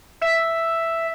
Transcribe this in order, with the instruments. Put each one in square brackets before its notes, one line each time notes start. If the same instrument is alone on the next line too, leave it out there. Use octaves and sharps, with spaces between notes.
[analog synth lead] E5